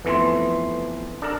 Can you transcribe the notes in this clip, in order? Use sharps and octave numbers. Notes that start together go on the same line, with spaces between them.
F2 E3 A3 B3 C6
D4 A4 A#4